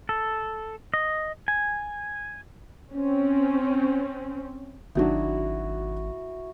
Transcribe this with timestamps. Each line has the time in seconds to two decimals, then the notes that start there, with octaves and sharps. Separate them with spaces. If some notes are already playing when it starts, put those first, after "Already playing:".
0.09 A4
0.94 D#5
1.48 G#5
2.92 C4 C#4
4.95 G#1 D#3 F#3 D4 E4 F#4